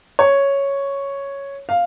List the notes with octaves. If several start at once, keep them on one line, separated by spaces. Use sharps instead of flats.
C#5
F5